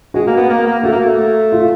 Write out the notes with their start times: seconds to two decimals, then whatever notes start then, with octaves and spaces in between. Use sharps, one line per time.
0.14 G#3 F#4
0.27 A#3
0.37 B3
0.50 A#3
0.67 A#3
0.83 A3 F#4
0.92 A#3
1.00 A3
1.52 F4